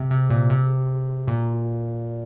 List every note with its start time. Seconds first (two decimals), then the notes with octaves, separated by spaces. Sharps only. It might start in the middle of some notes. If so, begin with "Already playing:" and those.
Already playing: C3
0.11 C3
0.30 A#2
0.50 C3
1.28 A#2